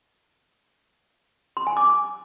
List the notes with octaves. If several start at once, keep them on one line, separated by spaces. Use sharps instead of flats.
C6
G#5
D6